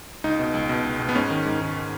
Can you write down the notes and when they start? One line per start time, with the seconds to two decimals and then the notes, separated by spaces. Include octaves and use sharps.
0.24 C#2 D#4
0.39 B2
0.54 C#2
0.69 B2
0.85 C#2
1.00 B2
1.09 B3
1.15 G#2 C#4
1.30 D#3
1.45 G#2
1.61 D#3